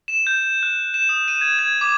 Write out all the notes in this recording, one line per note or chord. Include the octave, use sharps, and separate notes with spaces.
E7
G6
F#6
E7
D#6
D#7
G#6
G#6
D6